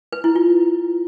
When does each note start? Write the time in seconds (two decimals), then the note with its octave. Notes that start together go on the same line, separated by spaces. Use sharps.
0.13 B4
0.24 E4
0.35 F4